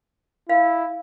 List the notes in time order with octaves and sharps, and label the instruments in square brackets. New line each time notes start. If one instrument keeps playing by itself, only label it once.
[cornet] E4 [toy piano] F5